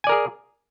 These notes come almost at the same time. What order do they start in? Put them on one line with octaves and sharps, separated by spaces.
G#5 D5 A#4 G#4